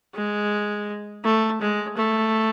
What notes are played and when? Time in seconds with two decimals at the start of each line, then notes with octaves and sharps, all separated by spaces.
0.15 G#3
1.24 A3
1.61 G#3
1.97 A3